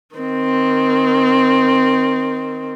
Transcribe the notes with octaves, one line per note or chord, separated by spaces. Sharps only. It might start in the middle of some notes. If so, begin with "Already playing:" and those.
D#3 C4